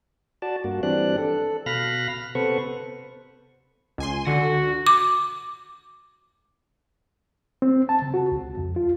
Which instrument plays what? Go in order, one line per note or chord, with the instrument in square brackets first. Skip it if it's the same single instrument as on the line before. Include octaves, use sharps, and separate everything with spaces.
[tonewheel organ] F#4 D5 A5
G2 A#3 F#4
E3 G3 C4 D4 D5 F#6
A4
B2 F5 B5 F6 F#6 A#6
C3 B3 A4 B4 C5 C#6
[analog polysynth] C#2 G#5 C6
[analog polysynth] D3 [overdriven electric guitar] F#4
[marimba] D6
[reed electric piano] C4
A5
C#3
F#4
C#2
F2
F4